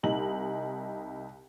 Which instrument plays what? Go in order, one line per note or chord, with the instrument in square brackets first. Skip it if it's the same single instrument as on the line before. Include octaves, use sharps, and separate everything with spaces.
[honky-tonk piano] C2 D#4 F#7